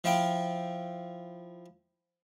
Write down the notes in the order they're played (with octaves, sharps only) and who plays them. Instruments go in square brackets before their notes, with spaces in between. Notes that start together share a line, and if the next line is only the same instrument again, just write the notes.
[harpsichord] F3 E4 F5 G5